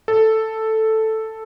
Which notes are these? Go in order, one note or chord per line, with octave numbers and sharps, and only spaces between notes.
A4